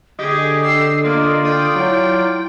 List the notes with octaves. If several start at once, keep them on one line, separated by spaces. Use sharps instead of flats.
D3 G4 G#4 D#5
G4 E6 C7
A#3 D4 F4 D5
G5 D#6
F#3 E4